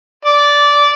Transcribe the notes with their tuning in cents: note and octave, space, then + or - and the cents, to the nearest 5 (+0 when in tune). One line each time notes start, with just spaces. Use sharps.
D5 -15